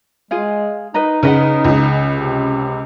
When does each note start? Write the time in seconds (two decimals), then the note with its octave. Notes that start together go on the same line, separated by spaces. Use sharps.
0.31 G#3 F4 G#4 F5
0.94 D#4 B4 D#5 A#5
1.23 C#3 B4 D#5 F#5
1.64 C#2 C#3
2.13 C3